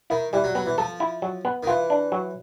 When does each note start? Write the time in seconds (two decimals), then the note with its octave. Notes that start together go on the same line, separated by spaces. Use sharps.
0.10 D#3 E4
0.33 E3 G3
0.44 F#3
0.55 F#3 B3
0.66 E3
0.78 F3 A4
1.00 E4
1.22 F#3
1.45 B3
1.63 D#3
1.67 E3 F4
1.90 D4
2.12 F#3